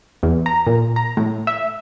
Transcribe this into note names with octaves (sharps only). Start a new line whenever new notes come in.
E2
A#5
A#2
A#5
A2
E5